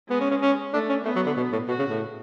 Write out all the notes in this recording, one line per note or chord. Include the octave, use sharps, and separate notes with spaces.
G#3 B3
C#4
C#4
C#4
A3 D4
C#4
A3 B3
F#3
D3
B2
A2
B2 F#4
C#3
A2